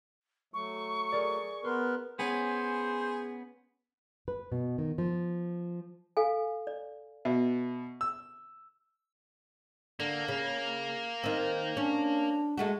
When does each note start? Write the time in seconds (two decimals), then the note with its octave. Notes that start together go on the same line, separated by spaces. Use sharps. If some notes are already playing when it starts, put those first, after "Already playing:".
0.54 F#3 A3 C#6
1.12 G#4 A#4 D5
1.64 B3 A#4 B4 C6
2.19 B3 C#4 G#4 C5
4.28 B4
4.52 B2
4.78 D#3
4.98 F3
6.17 A4 F5 G#5
6.67 D5
7.25 B2 E5
8.01 E6
10.00 D3 A#3
10.28 C#3
11.24 D#3 C4
11.77 C#4 D4
12.58 G#3 A3 F#4